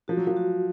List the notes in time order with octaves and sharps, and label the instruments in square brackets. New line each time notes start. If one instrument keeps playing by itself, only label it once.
[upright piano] F3 [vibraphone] F#4
[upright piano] F#3
F3
[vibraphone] F#4